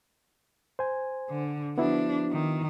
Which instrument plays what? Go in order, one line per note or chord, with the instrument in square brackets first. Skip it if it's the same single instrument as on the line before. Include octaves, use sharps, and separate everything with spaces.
[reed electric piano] C5 G#5
[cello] D3
[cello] F3 D4 [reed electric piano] B3 E4 F#4
[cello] D#3